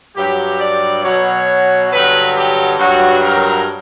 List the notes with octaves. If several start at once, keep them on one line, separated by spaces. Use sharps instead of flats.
G2 F#3 G4
D5
B2 F#3 C#5
G2 D3 F#3 B4
G4
G2 F#3 F#4
A#4